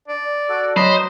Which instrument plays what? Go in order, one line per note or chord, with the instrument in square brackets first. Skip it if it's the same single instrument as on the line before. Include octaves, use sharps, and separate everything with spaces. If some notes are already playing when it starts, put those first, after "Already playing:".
[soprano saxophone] D5
[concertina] F#4 A4
[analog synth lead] F#3 [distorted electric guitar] C5 [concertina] D#5 A#5 [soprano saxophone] B5